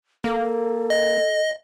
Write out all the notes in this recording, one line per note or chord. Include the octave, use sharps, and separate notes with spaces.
A#3 A4
D#5